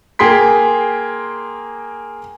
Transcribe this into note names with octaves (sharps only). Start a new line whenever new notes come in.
A#3 G#4 G5 C6 B6